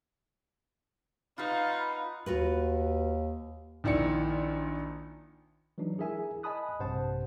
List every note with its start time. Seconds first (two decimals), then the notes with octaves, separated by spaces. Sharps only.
1.38 D#4 F4 B4 F5 F#5 B5
2.26 D#2 F4 F#4 B4
3.84 A#1 D#3 E4 D5 C#7
5.78 E3 F#3 G#3 D4 D#4
5.98 E4 G#4 A#4 E5 G#5
6.43 D#5 G#5 A5 B5 D#6 F#6
6.80 A#1 G2 C3 C5 F#5 A5